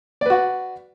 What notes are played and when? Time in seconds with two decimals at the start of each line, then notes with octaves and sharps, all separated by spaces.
0.21 D5
0.26 B4
0.30 F#4